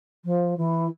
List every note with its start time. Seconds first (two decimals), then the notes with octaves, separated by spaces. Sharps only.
0.24 F3
0.57 E3